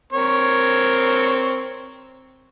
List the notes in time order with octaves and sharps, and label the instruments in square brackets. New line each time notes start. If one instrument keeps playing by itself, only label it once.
[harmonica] C4 A#4 C#5